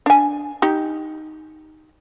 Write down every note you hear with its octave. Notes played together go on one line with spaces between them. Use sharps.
D4 G#5
D#4 G4